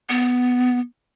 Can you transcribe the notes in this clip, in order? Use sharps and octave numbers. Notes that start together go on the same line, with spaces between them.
B3